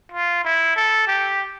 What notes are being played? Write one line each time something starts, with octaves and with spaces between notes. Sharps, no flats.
F4
E4
A4
G4